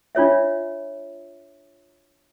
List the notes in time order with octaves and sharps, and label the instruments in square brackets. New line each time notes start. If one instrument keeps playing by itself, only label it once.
[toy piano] D4 F4 C#5 E5